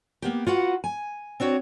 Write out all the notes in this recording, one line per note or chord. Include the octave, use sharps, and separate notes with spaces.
A#3 B3 G4
F4 F#4 B4 F#5
G#5
C4 D4 F#4 C#5